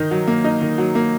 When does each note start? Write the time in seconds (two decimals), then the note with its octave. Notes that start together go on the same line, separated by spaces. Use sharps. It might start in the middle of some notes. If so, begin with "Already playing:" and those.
Already playing: D#3 D#4
0.11 F#3
0.28 A#3
0.44 D#4
0.61 D#3
0.78 F#3
0.95 A#3